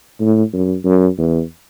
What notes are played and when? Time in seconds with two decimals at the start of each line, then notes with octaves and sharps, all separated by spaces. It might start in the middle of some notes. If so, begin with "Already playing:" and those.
0.21 A2
0.53 F#2
0.85 F#2
1.18 E2